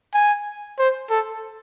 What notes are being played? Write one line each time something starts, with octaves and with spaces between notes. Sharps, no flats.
G#5
C5
A4